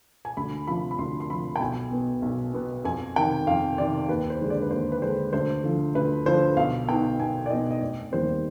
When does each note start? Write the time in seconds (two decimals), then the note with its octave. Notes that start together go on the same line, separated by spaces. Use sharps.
0.25 G#5
0.37 D2 B5
0.67 C3 F3 B5
0.91 B5
0.99 D2 C6
1.20 C6
1.29 C3 F3 B5
1.56 G5
1.60 B1 G#5
1.91 B2 B3
2.22 B1
2.53 B2 B3
2.84 F2 G#5
3.16 C3 D#3 G5
3.47 F2 F5
3.78 C3 D#3 D5
4.08 D#2 B4
4.30 C5
4.40 D3 G#3 D4
4.50 D5
4.62 B4
4.71 D#2 C5
4.92 B4
5.02 D3 G#3 D4 C5
5.33 D2 C5
5.63 D3 F3
5.95 D2 B4
6.26 D3 F3 C5
6.57 B1 F5
6.88 B2 B3 D#4 G5
7.19 B1 G#5
7.46 D5
7.50 B2 B3 D#4 D#5
7.71 D#5
7.82 F1 D5
8.12 D#2 D#3 G3 C4 C5